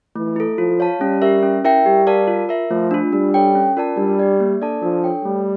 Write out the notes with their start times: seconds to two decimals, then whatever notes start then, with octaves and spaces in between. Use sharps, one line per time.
0.16 E3 A3
0.36 E4 A4
0.58 F3 F4
0.80 C#5 F5 A5
1.01 G3 C#4
1.22 G4 A#4 E5
1.43 C#4
1.64 E4 A#4 E5 G5
1.86 G3 G4
2.07 A#4 D5 F5 A5
2.27 F4
2.49 A#4 E5
2.71 F3 A3
2.91 D4 F4
3.13 G3 D4
3.34 A4 C#5 G5
3.55 C#4
3.77 F4 A#4 D5 A5
3.97 G3 D4
4.19 G4 D5
4.40 A#3
4.61 D4 A4 D5 A5
4.82 F3 D4
5.04 A4 C#5 G5
5.25 G3 A3